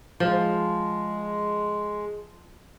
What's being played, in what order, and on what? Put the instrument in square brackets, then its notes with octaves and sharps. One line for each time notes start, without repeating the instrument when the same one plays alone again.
[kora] F3 [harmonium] G#3